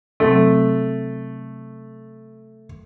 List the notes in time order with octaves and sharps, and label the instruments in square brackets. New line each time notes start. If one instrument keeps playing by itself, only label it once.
[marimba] C3 F#3 C4 [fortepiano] A3